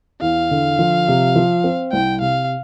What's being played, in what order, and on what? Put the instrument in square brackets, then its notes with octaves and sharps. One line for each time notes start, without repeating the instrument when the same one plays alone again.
[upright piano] E2 [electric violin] F5
[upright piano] D3
F3
C3
F3
C4
[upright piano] C2 [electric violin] G5
[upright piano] C3 [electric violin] F5